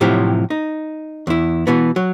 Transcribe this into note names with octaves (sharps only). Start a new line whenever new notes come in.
A2 C3 F3 F#3 E4 G4
D#4
E2 E4
B2 E3 B3
F#3